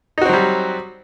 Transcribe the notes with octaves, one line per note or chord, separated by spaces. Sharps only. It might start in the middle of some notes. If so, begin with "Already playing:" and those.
F#3 G3 C4 D#4 F#4